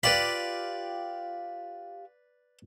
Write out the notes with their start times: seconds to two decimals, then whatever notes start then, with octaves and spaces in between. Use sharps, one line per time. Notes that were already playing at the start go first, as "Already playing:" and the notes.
0.03 F4 G4 B4 D5 F5 B5